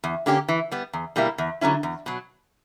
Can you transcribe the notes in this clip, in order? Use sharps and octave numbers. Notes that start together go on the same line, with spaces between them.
E2
D3 A#3 C#4 G4
E3
G3 B3
E2
B2 G3 A#3 E4
E2
D3 F#3 C#4 E4
E2
B2 F#3